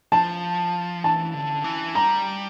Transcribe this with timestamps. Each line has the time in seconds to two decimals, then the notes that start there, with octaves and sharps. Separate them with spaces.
0.12 F3 A5
1.03 E3 A5
1.34 D3
1.64 E3
1.95 G3 A#5